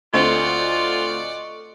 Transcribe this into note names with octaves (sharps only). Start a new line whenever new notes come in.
D2 C4 F4 A4 D5 D#5 F#5 C#6